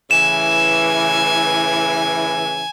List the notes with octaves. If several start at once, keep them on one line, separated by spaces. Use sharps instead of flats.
A2 C#3 E3 G#5 E7